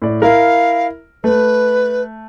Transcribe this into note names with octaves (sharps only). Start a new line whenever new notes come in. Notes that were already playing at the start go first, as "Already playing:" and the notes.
A2 D5
E4 A#4 F5
A3 B4